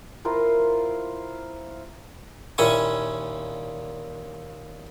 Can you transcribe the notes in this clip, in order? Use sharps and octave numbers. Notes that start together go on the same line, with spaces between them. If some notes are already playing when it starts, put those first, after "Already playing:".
E4 F4 A#4 C5
D#2 A#2 C#4 E4 G#5 C#6